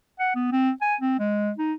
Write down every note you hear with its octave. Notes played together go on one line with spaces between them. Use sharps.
F#5
B3
C4
G#5
C4
G#3
D#4